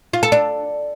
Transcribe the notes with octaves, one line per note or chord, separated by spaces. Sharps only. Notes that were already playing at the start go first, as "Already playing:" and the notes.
F4
A4
D4